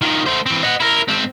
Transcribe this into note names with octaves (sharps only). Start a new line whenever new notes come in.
D#3 F3
A3 C5
E3 C4
D#5 F#5
E4 A#4
G#2 C4